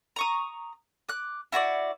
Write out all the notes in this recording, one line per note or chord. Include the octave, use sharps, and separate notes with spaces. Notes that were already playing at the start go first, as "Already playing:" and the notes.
A#5 C#6 D#6
D6 F#6
E4 F#4 C#5 D5